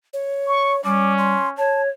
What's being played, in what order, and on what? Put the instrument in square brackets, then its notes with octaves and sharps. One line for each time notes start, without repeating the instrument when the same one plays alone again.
[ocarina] C#5
[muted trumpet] C#6
[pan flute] G3 [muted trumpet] C#4 [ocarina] D6
[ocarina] C6
[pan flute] C#5 [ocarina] A5